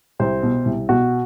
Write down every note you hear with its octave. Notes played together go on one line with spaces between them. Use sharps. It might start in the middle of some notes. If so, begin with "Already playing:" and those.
C2 C5
B2
C2
B2 F#4